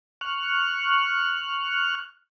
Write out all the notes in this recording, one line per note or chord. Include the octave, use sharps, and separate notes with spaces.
C#6 F6 F#6